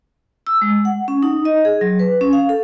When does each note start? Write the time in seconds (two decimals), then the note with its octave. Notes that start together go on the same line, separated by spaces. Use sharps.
0.47 E6
0.62 G#3
0.85 F#5
1.08 C#4
1.23 D#4
1.45 D#5
1.65 G#4
1.81 F#3
1.99 B4
2.21 C#4
2.33 F5
2.49 A4